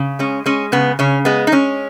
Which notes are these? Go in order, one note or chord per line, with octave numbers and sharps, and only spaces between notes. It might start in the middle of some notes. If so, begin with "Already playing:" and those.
Already playing: C#3
G#3 C#4
G#3 C#4
C#3 B3
C#3 C#4
G#3 B3
D#4
G#3 C#4